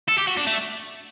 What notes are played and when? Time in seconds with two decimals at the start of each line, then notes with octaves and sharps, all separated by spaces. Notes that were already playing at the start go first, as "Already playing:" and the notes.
0.09 A4
0.18 G4
0.28 F#4
0.37 D4
0.47 A3